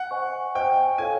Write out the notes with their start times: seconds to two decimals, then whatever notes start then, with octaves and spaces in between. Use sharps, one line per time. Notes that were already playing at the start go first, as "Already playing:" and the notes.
Already playing: F#5
0.11 C5 D#5 G#5 C#6
0.55 C5 D#5 G5 G#5 C#6
0.98 F4 A4 C#5 F5 G#5